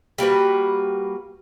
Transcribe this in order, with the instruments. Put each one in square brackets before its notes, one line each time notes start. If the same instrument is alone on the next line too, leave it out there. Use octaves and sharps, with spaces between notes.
[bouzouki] G3 A#3 F#4 B4